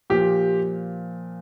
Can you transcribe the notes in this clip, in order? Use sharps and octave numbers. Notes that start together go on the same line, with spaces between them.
A#2 F3 G4